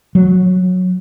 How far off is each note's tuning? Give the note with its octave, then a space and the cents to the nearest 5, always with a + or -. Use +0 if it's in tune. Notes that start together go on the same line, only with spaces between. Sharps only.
F#3 -15